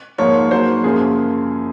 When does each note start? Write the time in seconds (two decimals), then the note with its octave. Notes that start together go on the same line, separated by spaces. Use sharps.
0.18 G#2 F3 A#3 C#5
0.51 G#2 F#3 A#3 C5
0.84 F#2 C#3 F3 A#3 G#4